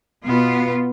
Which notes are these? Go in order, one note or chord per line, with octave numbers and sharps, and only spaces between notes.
B2 B3 F4